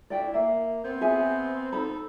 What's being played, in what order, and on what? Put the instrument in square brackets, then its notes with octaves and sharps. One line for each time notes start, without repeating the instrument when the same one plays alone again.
[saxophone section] A3 D4 E4 [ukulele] D5 G5
[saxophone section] A#3 [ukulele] E5
[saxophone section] B3 C4
[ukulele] G#4 E5 G#5
[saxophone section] D#4 A4 [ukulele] C5 B5